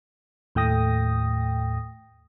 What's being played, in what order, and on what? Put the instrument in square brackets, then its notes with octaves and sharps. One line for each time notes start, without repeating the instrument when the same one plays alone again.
[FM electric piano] D#2 A2 A3 G5 D#6 A#6